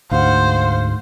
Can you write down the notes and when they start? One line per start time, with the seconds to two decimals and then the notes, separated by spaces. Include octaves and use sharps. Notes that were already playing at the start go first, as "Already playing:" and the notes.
0.11 D2 G#2 C5 F5 F#5